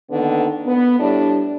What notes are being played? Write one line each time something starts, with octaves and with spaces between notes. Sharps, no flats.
D3 D#3 A#3 B3
B3
A2 G3 D4